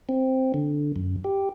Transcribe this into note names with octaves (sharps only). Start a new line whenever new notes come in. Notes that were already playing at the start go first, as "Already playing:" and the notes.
C4
D3
F#2
G4